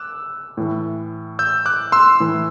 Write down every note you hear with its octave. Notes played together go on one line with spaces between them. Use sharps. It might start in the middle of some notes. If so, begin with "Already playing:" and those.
Already playing: D6 E6 F#6
A2 E3
E6 G6
D6 F#6
C6 E6
A2 E3